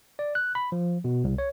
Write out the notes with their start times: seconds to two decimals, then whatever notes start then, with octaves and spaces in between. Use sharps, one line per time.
0.19 D5
0.35 F#6
0.55 B5
0.72 F3
1.04 B2
1.24 C2
1.38 C#5